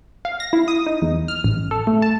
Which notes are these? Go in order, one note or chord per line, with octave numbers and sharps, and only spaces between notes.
F5
A#6
E4
D#6
D#4
E2
F6
A1
A4
A3
A5